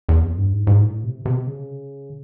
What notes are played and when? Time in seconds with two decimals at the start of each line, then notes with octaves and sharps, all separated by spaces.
0.09 E2
0.22 F2
0.38 G2
0.53 G#2
0.67 G#2
0.81 A2
1.04 C3
1.25 C3
1.47 C#3